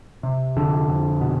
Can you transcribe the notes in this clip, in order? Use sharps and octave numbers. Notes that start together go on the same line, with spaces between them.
C3
F2 D3
F2
B2